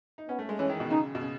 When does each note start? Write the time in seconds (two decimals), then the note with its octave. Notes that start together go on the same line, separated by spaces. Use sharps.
0.18 D#4
0.29 B3 C#4
0.39 A3
0.49 G#3
0.59 E3 C#4
0.70 D#3
0.80 B2
0.90 C#3 D#4
1.15 B2
1.21 C#3